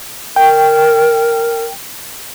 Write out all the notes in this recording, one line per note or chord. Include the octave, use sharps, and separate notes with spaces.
A#4 G5